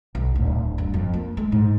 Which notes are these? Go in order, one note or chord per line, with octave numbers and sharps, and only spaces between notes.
B1
D1
G2
F2
A#3
G#3
G#2